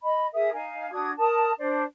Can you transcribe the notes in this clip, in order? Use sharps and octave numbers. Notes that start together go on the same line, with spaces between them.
D#5 B5
G#4 A#4 E5 D#6
D#4 F5 G#5
D4 F#4 D#6 G#6
A#4 A5 D#6
D4 C5 D5